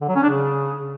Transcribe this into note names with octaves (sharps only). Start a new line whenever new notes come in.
D3
F#3
C#4
D4
C#3